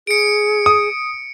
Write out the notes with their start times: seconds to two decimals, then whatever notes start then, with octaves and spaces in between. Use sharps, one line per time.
0.07 G#4 C#7 D7
0.66 D#6